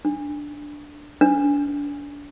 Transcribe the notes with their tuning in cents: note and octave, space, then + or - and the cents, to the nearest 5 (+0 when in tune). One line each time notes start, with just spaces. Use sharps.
D4 +0
D4 -35